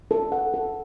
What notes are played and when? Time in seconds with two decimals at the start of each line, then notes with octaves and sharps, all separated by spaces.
0.11 A4
0.32 F#5
0.54 A4